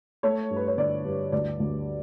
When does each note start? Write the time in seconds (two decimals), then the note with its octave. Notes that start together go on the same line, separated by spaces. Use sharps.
0.23 A3 C#5
0.51 G2
0.56 B4
0.67 C#5
0.78 D3 D5
1.05 G2
1.32 D2 D5
1.60 D2